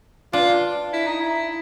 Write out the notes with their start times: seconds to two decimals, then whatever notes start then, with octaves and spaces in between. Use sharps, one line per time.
0.33 D4 F4
0.93 E4
1.07 D#4
1.21 E4